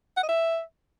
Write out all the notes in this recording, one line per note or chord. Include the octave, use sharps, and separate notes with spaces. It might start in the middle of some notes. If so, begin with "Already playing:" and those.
F#5
D#5
E5